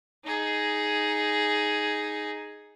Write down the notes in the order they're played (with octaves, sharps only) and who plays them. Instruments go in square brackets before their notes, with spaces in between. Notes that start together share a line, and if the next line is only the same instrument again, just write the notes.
[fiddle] D#4 G#4